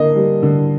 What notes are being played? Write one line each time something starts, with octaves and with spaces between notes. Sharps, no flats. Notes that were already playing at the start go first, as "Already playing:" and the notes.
Already playing: D3 A#3 D#5
G3
D3